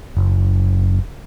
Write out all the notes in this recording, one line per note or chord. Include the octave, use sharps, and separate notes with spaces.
F#1